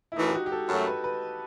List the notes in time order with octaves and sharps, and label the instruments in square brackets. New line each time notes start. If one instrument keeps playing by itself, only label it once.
[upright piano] E4
[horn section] F#2 E3 A3 [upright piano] D#4
[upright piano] G4
F#4
G4
A4
[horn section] F#2 F#3 A3 [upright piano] A4
[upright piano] B4
B4